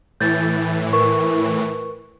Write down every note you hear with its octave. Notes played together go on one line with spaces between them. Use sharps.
A2 E3 G6 A6
A#4 B4 C#6